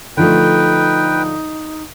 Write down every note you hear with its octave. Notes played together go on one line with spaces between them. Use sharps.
D3 F3 A3 D#4 B4 G5